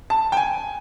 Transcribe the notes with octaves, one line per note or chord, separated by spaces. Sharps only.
A5
G5
G#5